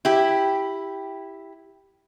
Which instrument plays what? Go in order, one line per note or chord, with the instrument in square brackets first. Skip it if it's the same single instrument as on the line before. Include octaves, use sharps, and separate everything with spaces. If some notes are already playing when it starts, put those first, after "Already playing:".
[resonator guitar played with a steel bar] E4 G4